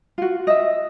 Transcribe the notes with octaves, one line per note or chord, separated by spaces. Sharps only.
F4 F#4
D#5 E5